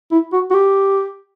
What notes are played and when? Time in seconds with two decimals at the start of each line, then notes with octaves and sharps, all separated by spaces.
0.12 E4
0.33 F#4
0.50 F#4
0.54 G4